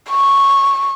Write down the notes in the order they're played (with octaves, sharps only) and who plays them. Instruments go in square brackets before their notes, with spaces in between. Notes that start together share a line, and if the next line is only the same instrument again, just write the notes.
[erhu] C#6